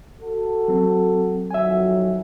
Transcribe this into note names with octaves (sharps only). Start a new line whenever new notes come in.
F#4 A4
F#3 C4
F2 D#3 F#3 E5 G#5